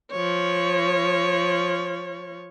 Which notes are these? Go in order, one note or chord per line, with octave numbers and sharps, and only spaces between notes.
F3 C#5